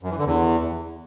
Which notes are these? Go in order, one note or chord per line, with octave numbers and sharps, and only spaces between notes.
F#2
E3
D3
E2